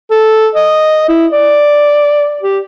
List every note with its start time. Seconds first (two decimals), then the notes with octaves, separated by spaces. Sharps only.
0.11 A4
0.55 D#5
1.09 E4
1.33 D5
2.42 G4